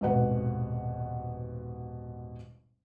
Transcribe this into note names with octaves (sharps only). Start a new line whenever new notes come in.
D#1 G#1 B2 B4 F#5